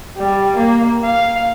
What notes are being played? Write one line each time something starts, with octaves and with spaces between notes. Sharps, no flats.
G3
A#3
F5